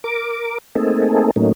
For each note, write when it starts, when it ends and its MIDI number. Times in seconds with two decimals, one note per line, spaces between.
0.04 0.58 70
0.04 0.58 86
0.75 1.31 57
0.75 1.31 58
0.75 1.31 60
0.75 1.31 63
0.75 1.31 68
0.75 1.31 69
1.36 1.52 45
1.36 1.52 54
1.36 1.52 57
1.36 1.52 58
1.36 1.52 61
1.36 1.52 63